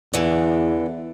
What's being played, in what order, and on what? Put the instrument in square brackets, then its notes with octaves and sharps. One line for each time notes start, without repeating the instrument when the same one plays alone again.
[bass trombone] E2 [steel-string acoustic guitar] D3 E3